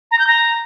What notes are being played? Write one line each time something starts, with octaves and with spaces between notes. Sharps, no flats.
A#5
G6
A#5